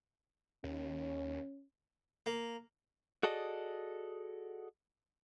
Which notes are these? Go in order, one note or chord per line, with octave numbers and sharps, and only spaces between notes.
D#2 C#4
A#3
F#4 G#4 A4 D5 D#5